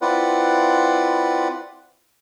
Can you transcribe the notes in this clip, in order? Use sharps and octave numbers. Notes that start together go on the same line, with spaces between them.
C4 E4 F4 B4 D5 F#5